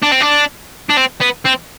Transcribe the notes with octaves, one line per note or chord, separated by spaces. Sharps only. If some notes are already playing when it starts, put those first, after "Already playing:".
D4
C4
D4
D4
C4
B3
C4